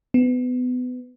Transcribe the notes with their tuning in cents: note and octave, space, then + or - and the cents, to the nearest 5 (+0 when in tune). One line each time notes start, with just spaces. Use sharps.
B3 +25